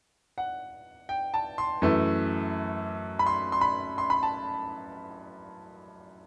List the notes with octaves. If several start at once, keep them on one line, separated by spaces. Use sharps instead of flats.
F#5
G5
A5
C6
F#2 E3 A3
B5
C6
C6
B5
C6
B5
A5